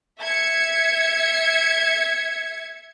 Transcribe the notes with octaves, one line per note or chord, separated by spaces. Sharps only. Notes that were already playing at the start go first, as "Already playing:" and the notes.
E5 G#6 C#7